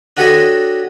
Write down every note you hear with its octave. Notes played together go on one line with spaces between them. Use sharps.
D4 F#4 G4 A4 C#5 D#5